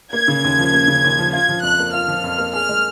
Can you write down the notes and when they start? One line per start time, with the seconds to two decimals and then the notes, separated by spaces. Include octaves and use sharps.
0.13 A#3 G#6
0.28 C#3
0.44 D#2
0.59 F3
0.73 A#3
0.88 C#3
1.04 D#2
1.19 F3
1.33 F4 G#6
1.49 F3
1.63 F2 F#6
1.79 A#3
1.93 F4 F6
2.08 F3
2.24 F2
2.38 A#3
2.53 G#4 F6
2.69 G#3